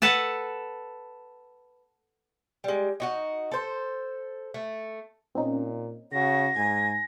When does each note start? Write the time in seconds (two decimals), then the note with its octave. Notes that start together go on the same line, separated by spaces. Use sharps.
0.02 A4 B4 F#5 A5
2.64 G3 G#3
3.00 D#4 F#4 D#5
3.52 A4 C5
4.54 A3
5.35 A#2 C4 C#4 D#4
6.12 C#3 F#4 A#6
6.56 G#2 G#5 G#6